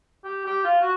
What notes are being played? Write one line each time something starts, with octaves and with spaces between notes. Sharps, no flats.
G4
G4
F4
F#4